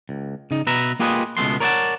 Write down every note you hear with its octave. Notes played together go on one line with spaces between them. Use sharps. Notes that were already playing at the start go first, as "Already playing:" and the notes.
C#2
C#3 D#4
B2 B4 E5 A#5
A#3 F4 G4 G#4 B4 D#5
C#2 B2 G#3 A3 B3 C6
A#4 C#5 D5 E5 F#5 A5